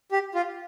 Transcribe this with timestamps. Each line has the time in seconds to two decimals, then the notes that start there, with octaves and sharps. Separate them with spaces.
0.12 G4
0.35 F4